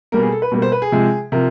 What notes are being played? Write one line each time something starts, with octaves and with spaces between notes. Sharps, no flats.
B2 G3 A#3 A#4
G#4
A4
B4
B2 G3 A#3
C5
B4
G#4
C3 F3 G#3
C3 F3 A#4